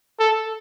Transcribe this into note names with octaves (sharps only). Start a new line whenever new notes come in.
A4